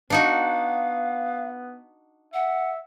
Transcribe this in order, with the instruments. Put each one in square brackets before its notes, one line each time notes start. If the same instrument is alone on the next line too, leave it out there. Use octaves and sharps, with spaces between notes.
[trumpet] B3 [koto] D4 D#4 F#4 [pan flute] F5
[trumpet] E5 [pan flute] F#5